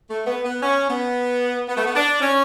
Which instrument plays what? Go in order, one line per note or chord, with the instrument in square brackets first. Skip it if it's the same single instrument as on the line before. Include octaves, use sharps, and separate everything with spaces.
[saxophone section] A3
B3
B3
C#4
B3
B3
A3
B3
D4
C#4